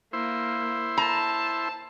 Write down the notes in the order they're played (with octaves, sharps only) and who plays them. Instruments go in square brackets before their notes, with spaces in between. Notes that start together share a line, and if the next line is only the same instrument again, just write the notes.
[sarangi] A#3 [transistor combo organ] E4 C5
[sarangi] A5 [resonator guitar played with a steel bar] A#5